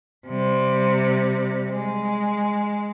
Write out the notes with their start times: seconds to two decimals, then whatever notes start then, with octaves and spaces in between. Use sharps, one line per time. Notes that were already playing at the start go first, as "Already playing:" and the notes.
0.28 C3 G3
1.70 G#3